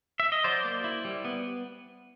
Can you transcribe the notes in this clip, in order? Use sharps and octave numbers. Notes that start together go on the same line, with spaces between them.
E5
D#5
F#3 C5 D5
A#3
E4
G3
B3